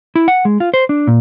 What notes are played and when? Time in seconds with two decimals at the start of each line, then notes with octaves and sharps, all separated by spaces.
0.15 E4
0.28 F#5
0.45 G#3
0.60 F4
0.74 C5
0.89 D4
1.07 A#2